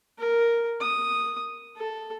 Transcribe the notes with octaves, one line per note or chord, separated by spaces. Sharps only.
A#4
D#6
A4